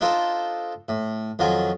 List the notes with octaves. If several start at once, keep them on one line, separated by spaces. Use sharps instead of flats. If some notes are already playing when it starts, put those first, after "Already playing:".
D4 D#4 F4 A4 C5
A2
F2 D#3 F#3 F4 G#5